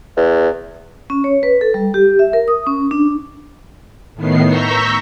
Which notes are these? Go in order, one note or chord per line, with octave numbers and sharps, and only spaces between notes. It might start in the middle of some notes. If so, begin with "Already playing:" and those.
E2
C#4
C#5
B4
A4
G3
G4
E5
A#4
D#6
C#4
D4
A2 D#3 B3 C7
A#5 C#6 E6 G6 A#6 B6